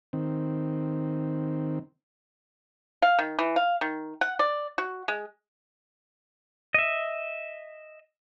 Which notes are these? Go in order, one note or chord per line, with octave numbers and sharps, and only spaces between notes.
D#3 C4
F5
D#3
E3
F5
D#3
F#5
D5
F#4
G#3
D#5 E5